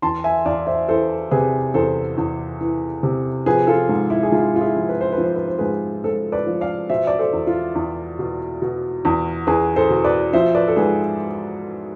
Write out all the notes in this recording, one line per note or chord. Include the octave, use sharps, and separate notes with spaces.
E2 A5 C6
E5 G#5
E2 D5 F5
C5 E5
E3 A4 C5
C3 G#4 B4
E2 A4 C5
E2
E3
C3
F3 G#4 B4
F4 A4
G#2
E4
G#4
G#2 F4
F4
E4 G#4
F3
B4
C5
B4
F3
C5
B4
C5
G#2 G#4 B4
G#2 A4 C5
B4 D5
F3
D5 F5
B2 C5 E5
D5
A4 C5
E2
F4
E2
B2
B2
E2
E2 G#4 B4
A4 C5
B2
B4 D5
F3 C5 E5
B4 D5
A4
G#2 G#4 B4